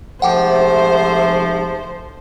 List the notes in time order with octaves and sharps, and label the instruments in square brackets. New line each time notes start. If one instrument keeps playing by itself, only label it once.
[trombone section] G#2 C3 A3 [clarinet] F3 [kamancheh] C5 [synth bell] F#5 G5 D6